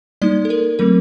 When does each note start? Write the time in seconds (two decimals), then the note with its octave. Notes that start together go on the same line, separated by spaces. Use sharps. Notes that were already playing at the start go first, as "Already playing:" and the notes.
0.22 G3 A#3 D#4 D5
0.45 A4
0.50 A#4
0.79 F#3 A3 C4 A#4